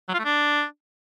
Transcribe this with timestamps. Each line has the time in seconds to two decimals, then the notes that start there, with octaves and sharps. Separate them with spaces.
0.09 F#3
0.14 F4
0.19 A3
0.25 D4